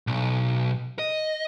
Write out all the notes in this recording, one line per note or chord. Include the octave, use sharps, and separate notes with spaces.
B1
D#5